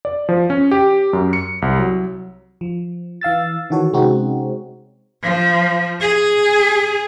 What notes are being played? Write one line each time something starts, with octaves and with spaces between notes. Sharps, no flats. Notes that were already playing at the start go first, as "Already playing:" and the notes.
D5
F3
C#4
G4
F#2
C#7
C2
F#3
F3
E3 F5 E6 A6
D#3 E3 F#4 A4 C#5
C3 G#3 C4 C#4 D#4 F#4
F3
G#4